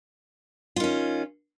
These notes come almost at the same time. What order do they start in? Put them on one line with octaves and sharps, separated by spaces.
F4 D#3 C#4